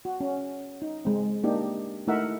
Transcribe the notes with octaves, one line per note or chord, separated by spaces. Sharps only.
F#4
C#4
D#4
G#3 C4
A#3 D4 D#4 G4
A3 D#4 E4 A#4 E5 F#5